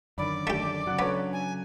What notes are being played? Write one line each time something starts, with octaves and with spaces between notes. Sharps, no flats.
F#2 D3 D#3 D5 B5
A3 G4 A4
C#3 F#3 F#5 D6 F#6
B3 D4 A4 C#5
G#5